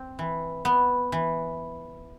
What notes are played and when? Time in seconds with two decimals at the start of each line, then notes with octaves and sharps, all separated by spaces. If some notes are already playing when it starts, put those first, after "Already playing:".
Already playing: C4
0.19 E3
0.65 B3
1.12 E3